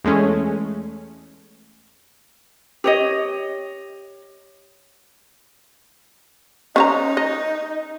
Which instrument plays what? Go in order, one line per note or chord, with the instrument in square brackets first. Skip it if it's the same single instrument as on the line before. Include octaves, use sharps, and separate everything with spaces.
[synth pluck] E2 G#3 A3 C#4
[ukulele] G4 C#5 D#5
[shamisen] C#4 C5 A#5 [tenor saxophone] D#4
[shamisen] D#5